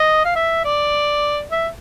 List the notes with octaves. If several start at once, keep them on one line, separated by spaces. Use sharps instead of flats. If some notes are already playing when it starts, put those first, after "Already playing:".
Already playing: D#5
F5
E5
D5
E5